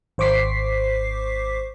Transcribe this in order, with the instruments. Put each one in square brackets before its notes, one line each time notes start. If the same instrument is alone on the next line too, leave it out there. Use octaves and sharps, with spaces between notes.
[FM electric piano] G#1 C5 C#6 D6 B6 C7